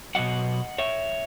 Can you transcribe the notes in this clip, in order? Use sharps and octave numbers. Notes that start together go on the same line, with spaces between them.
B2 F#3 D#5 F#5
C#5 E5